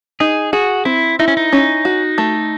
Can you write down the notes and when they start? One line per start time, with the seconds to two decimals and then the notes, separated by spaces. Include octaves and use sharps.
0.20 D#4 G#4
0.53 F#4 G#4
0.85 C4 E4
1.19 D#4 E4
1.28 C#4
1.37 D#4
1.52 C#4
1.85 F#4
2.18 A3